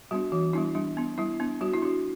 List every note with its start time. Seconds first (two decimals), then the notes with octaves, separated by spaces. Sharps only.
0.11 G3 B3 D4 F#4
0.32 E3 F#4
0.53 G3 B3 D4 E4
0.75 G3 D4
0.97 B3 D4
1.18 G3 E4
1.40 B3 D4
1.61 G3 F#4
1.73 E4
1.82 D4 F#4